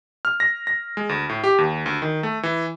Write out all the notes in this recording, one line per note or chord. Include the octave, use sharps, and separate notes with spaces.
F6
A#6
A#6
G#3
D2
A2
G4
D#2
D2
D#3
A3
E3